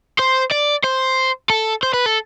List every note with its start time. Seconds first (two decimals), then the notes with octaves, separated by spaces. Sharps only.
0.19 C5
0.52 D5
0.84 C5
1.50 A4
1.83 C5
1.94 B4
2.06 A4